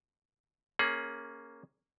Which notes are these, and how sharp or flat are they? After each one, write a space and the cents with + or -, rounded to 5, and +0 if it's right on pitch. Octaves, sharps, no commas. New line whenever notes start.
A#3 +0 C#4 +0 G#4 +25